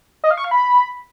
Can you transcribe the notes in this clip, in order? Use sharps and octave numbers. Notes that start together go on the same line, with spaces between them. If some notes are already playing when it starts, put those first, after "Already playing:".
D#5
F5
C#6
F5
B5